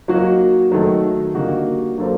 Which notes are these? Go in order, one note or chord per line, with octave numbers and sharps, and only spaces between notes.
F#3 A#3 D#4 F#4
D#3 F#3 A3 D#4 A4
D3 G3 A#3 D#4 F#4
F#3 A#3 D4 A4 C5